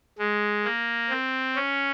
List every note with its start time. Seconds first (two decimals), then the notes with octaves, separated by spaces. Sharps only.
0.19 G#3
0.65 A#3
1.10 C4
1.56 C#4